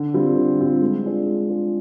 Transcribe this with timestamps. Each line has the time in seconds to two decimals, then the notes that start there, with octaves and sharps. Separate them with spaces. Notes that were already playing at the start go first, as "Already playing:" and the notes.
Already playing: D3
0.14 G3 C4 F4
0.36 D3
0.59 G3 C4 F4
0.81 G#3
1.04 D4 F4 G#4
1.26 G#3
1.49 D4 F4 G#4